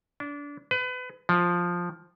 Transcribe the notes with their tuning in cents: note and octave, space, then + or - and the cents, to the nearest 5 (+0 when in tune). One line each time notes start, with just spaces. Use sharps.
D4 -25
B4 +30
F3 +5